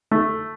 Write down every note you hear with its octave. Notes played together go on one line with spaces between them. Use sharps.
A3